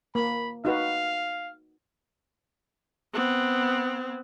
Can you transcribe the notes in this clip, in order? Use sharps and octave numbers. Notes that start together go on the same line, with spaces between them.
A#3 B5
D#4 F#4 B4 F5
B3 C4